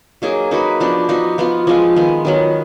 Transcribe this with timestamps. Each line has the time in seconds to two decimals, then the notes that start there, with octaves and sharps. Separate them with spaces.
0.22 F#3 A#3 D#4 G#4
0.51 A#3 D#4 F#4 B4
0.80 F3 B3 D4 F#4
1.09 F3 B3 D#4 F#4
1.38 F3 B3 F4
1.67 F3 G#3 B3 F4
1.96 D#3 G#3 B3
2.25 D#3 F#3 B3